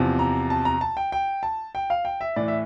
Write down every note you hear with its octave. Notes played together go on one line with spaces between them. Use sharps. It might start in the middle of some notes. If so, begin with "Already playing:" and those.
Already playing: E2 C3 F3
A#5
A5
A#5
A5
G5
G5
A5
G5
F5
G5
E5
A2 E3 D5
E5